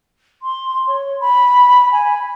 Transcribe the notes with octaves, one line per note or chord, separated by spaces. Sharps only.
C6
C#5
B5
G#5